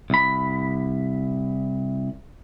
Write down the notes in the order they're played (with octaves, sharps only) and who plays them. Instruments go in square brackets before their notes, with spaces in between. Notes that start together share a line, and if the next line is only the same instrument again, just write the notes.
[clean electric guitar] C2 B5